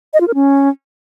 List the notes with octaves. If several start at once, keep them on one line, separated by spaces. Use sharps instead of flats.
D#5
F4
A#4
C#4